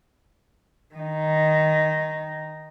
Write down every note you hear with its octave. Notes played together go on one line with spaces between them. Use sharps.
D#3 D#4